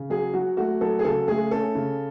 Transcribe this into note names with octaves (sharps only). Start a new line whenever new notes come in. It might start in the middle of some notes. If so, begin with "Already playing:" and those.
Already playing: C#3
F#3 G#4
F#3 F#4
A3 F#4
F#3 A4
G#4
C#3 A4
A3 G#4
C#4 A4
C#3